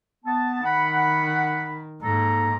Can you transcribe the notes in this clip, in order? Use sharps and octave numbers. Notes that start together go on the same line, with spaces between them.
B3 A5
D#3 F#5 B5
G#2 A#3 A4 A#5